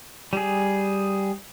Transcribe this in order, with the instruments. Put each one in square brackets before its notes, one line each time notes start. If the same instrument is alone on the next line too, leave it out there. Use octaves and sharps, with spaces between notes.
[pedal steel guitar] G3 G#4